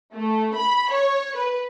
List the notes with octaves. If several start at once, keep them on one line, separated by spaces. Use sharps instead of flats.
A3
B5
C#5
B4